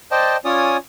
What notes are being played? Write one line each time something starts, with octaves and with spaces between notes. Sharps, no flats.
C5 D5 D#5 G5 A5
C#4 F4 C#5 D5 G#5 D#6